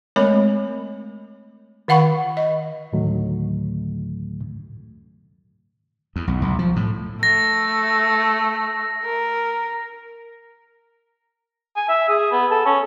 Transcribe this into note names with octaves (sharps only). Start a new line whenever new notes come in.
G#3 A3 C4 A#4 C#5 B5
D#3 F5 F#5 B5 C#6
D#5
D2 A2 D3 D#3 F#3 A3
E2
B1
B1
F3
A2
A3 A#6
A#4
G#5
E5
G#4
B3
A4
C#4